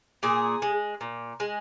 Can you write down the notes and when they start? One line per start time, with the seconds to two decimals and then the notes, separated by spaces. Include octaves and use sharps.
0.23 A#2 G#4
0.62 G#3
1.01 A#2
1.40 G#3